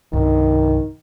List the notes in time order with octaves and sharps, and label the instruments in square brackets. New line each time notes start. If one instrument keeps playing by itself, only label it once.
[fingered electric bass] C2 G2 C3 [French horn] D#3